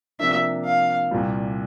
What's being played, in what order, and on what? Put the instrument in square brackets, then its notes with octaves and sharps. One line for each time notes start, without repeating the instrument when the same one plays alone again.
[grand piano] C3 F3 A#3 D4 [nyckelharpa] E5
[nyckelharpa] F5
[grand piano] C2 A#2 G3